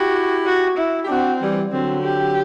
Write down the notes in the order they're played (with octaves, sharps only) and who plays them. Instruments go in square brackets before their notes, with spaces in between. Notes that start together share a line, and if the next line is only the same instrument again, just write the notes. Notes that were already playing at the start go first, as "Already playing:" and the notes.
Already playing: [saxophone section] E4 G4 [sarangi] F#4
[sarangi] F#4
E4
[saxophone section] G4
[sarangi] C4 [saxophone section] D4 F#4
[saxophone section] E3 G3
[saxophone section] D3 F#3 [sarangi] C4
[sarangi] G4